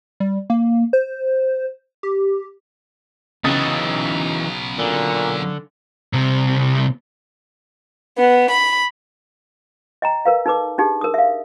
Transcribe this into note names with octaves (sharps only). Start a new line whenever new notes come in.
G3
A#3
C5
G4
C#3 E3 F#3 B3 D#4 D#6 A6
A#2 D3
C2 C3
B3
B5
D#5 G5 A#5
A#4 B4 F5
D#4 A4 B4 D6
D4 D#4 G4 G#4
A#4 D#6
E5 F5